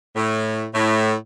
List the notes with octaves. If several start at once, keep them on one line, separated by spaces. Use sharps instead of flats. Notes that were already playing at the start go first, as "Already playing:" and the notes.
A2
A2